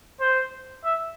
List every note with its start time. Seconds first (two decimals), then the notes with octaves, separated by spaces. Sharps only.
0.20 C5
0.84 E5